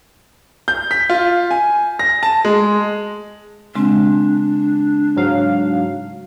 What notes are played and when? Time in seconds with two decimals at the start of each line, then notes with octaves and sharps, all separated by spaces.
0.68 G6
0.91 B6
1.10 F4
1.51 G#5
1.99 A#6
2.23 A5
2.45 G#3
3.75 C#3 G#3 C4 D4
5.17 G#2 F#3 F5